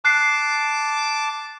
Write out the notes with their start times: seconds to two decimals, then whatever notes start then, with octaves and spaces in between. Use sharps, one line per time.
0.05 A5 D6 F#6 C7